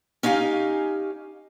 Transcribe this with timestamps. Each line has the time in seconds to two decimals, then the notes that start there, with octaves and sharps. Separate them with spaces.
0.23 C#4 D#4 G4 F5 G#5